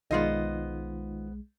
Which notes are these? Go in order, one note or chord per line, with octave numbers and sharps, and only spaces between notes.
B1 D#3 G#3 B3 D#4 F4 C5 D#5